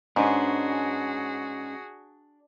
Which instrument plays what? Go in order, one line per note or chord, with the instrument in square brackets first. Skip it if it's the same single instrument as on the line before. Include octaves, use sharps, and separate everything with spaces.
[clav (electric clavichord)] G#2 [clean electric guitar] C#4 B4 [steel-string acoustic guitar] D4 [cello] F#4 G#4